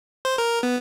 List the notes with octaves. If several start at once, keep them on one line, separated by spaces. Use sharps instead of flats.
C5
A#4
B3